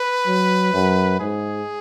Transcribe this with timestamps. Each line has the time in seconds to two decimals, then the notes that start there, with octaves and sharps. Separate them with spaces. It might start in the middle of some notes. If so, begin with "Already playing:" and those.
Already playing: B4
0.26 F#3
0.73 F#2
1.20 G#2 G#4